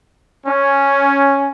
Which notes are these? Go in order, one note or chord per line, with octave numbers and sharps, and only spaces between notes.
C#4